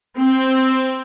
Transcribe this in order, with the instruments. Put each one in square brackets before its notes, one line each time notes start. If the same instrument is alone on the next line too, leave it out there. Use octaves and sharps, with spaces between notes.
[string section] C4